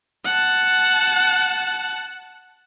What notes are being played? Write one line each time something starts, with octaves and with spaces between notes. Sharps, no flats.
F#5 A5